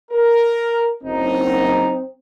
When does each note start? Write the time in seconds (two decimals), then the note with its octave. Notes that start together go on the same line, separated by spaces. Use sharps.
0.11 A#4
1.03 F#1 C4 D#4